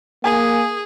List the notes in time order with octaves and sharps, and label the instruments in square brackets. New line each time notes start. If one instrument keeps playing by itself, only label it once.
[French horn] A#3 [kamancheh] G#4 [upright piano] G#5